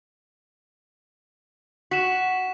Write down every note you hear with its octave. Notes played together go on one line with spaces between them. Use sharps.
F#4 B6 E7